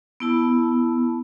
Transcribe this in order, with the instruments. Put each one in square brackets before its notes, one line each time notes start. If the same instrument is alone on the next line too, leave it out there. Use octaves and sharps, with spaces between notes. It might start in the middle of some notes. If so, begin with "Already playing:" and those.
[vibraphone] B3 E4 A5